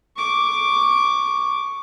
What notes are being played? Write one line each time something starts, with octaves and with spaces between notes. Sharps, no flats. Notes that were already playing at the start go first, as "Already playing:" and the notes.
C#6 D6